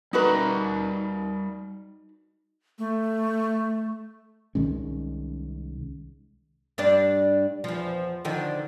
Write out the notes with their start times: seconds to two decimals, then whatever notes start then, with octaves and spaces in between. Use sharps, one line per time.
0.13 G3 D#4 F#4 A#4 B4 A#5
2.79 A3
4.55 C2 D#3 G#3 C#4
6.78 G2 D4 D5
7.64 E2 F3
8.25 D3 D#3 F3